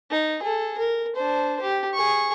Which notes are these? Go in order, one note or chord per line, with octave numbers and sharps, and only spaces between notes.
D#4
G#4 A4
A#4
D4 C5
G4
G#4 C#6